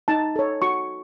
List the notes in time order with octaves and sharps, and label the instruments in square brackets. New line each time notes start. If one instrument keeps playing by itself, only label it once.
[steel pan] D#4 A5
A4 C#5
F#4 C#6